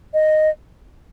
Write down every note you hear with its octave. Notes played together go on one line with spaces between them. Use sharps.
D#5